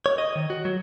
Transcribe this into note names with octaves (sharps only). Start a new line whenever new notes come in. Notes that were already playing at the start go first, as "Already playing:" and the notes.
C#5
D#5
D#3
F#4
F#3